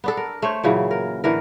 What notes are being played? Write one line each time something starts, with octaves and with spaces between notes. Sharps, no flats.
B3 D4 A4
A#4
A3 C5 C#5
A#2 C#3 E3 F#3
A#4
A2 D3 E3 A#4